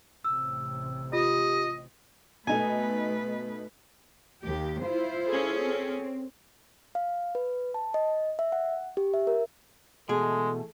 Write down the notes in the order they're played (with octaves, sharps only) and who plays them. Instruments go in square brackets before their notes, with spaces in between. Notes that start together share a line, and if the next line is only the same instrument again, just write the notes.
[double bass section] A1 C3 [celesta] E6
[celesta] F4 [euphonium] G4 [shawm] D#5
[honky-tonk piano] B2 D#4 A4 [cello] A3 B4 [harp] G#5
[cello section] D#2 G4
E4 F4 C5
[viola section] C#4 G#4 A4
[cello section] C4
[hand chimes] F5
B4
A5
D#5
E5
F#5
G4
E5
A#4
[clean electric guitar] B2 [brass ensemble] E3 A3 A4 [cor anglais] G#3 [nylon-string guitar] G#4